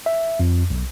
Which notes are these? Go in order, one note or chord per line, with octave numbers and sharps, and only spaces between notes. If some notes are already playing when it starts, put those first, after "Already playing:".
E5
F2
B1